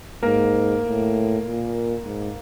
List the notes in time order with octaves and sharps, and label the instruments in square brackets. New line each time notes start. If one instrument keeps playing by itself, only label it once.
[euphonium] G#2 [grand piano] A#3 A#4
[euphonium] A2
A#2
G#2